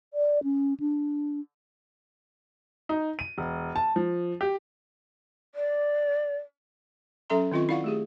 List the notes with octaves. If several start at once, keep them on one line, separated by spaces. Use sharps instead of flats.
D5
C#4
D4
D#4
D#7
E1
A5
F3
G4
D5
F#3 C#4 A4 E5 A#5 C6
D#3 C4 F4 D#5 C#6
E4 D5 F5 F#5 C#6
A3 G4 G#4